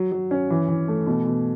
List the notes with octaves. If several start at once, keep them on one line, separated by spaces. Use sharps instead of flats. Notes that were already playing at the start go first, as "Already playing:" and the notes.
Already playing: F#3
F#3
C#4
E3
E3
A3
B2
B2